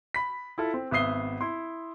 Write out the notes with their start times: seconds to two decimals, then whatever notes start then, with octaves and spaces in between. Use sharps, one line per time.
0.14 B5 B6
0.58 E4 F4 A4
0.74 C4
0.91 G#1 B3 E5 D#6 C7 G7
1.41 E4 C6